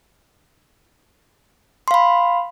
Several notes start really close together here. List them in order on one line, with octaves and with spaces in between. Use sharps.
C6 F5 B5